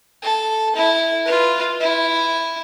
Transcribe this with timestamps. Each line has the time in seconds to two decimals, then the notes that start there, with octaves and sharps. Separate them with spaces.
0.22 A4
0.76 E4
1.25 F4 B4
1.80 E4